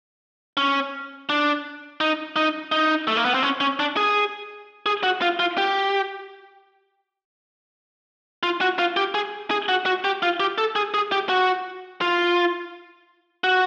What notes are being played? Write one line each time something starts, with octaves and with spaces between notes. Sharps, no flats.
C#4
D4
D#4
D#4
D#4
A3
A#3
B3
C4
C#4
C#4
D4
G#4
G#4
F#4
F4
F4
G4
F4
F#4
F4
G4
G#4
G#4
F#4
F#4
G4
F4
G4
A4
G#4
G#4
G4
F#4
F4
F#4